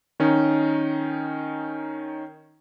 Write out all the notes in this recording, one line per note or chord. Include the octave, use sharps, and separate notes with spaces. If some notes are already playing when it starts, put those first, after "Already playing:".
D#3 C#4 D#4